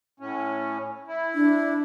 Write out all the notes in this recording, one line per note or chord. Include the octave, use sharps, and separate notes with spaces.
A2 C#4
E4
D4